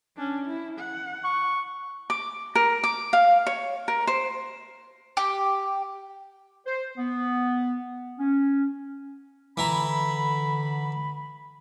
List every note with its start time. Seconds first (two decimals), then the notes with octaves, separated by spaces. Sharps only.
0.17 C#4 D4
0.47 E4
0.79 F#5
1.24 C#6
2.10 D6
2.55 A#4
2.84 D6
3.13 F5
3.47 C#5
3.88 A#4
4.07 C5
5.17 G4
6.66 C5
6.97 B3
8.19 C#4
9.57 D3 E3 E4 A#5 B5